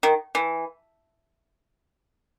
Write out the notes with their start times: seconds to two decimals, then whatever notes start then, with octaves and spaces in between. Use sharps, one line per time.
0.03 D#3
0.35 E3